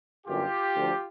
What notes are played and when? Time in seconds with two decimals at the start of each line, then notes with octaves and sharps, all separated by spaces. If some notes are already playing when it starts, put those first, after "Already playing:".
0.27 G1 F#2 D3 F4 G4
0.74 D2 D3 F3